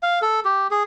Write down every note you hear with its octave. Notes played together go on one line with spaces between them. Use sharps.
F5
A4
G4
G#4